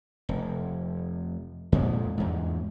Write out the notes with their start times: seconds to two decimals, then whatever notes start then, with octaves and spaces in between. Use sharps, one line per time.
0.29 F1
1.72 F2 A#2 G#3
2.17 E2 G#2